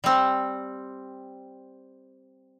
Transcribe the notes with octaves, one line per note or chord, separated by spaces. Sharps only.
G3 C4